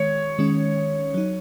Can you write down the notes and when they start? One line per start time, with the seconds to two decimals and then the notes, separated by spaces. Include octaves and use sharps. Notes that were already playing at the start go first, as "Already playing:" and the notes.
Already playing: D#3 G#3 C#5
0.39 D#3 G#3 C#4
1.14 F#3 D#4